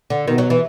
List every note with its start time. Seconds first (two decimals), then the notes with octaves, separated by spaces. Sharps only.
0.10 D3
0.27 B2 D#3
0.38 F#3
0.50 E3